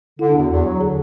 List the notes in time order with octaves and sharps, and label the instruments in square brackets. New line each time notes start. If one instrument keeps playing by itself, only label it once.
[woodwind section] D3 [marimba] E4
[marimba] D4
[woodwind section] E2
[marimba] F#4
[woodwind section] E2
F#3
[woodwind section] D3 [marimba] G#4